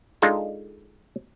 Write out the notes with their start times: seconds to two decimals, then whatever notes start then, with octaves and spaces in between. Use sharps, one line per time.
0.22 G#3 D4 D#4 F4 A4